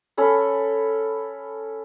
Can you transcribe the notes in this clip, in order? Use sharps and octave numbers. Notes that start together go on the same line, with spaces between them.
C#4 A4 B5